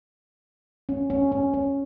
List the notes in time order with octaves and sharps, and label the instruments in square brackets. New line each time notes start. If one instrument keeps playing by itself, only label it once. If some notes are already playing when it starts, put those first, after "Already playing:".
[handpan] C#4
C#4
C#4
C#4